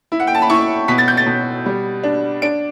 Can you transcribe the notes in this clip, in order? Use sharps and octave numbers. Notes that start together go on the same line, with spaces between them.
E4
F#5
G5
A5
B5
E4 C#6
B2 B6
A6
G6
A6
B2
G3
D4
D4 D7